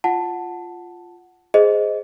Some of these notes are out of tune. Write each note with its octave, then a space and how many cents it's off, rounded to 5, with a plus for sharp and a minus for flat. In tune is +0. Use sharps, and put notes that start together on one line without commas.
F4 +0 F#5 +0 A5 +0
G#4 +0 C5 +0 D#5 +0